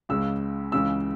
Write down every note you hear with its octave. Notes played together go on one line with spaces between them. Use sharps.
C#2 C#3 G#3 E6
C#2 C#3 E3 G#3 E6